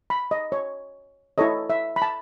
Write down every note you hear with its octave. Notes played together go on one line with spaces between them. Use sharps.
B5
D#5
C#5
E4 A4 C#5 D#5
E5
B5
A5